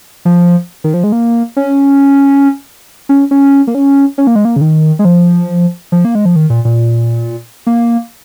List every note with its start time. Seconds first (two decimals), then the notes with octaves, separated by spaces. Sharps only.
0.25 F3
0.84 D#3
0.94 F3
1.04 G#3
1.12 A#3
1.56 C#4
3.09 C#4
3.31 C#4
3.67 A#3
3.75 C#4
4.18 C#4
4.27 A#3
4.36 G#3
4.45 A#3
4.56 C#3
4.61 D#3
4.99 G#3
5.05 F3
5.92 F3
6.05 A#3
6.15 G#3
6.25 F3
6.36 D#3
6.50 A#2
6.65 A#2
7.67 A#3